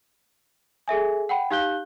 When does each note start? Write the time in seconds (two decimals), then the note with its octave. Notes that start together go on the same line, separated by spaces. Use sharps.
0.88 G#4 A4 E5 G#5
1.29 F#5 G5 B5
1.51 D#4 G4 F5 F#6 G6 G7